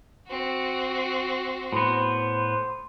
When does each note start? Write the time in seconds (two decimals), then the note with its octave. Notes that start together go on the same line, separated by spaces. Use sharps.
0.27 C4 F#4
1.73 A2 B3 C5